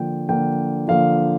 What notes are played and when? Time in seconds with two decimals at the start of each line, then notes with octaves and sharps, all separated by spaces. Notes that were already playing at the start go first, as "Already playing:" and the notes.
Already playing: D3 F3 A#3 G5
0.29 D3 F3 A#3 G5
0.88 D3 F3 A#3 F5